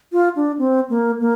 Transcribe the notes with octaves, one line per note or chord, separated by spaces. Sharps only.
F4
D4
C4
A#3
A#3